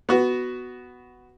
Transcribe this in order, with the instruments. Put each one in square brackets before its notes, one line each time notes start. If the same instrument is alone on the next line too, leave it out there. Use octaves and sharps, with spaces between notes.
[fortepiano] B3 F#4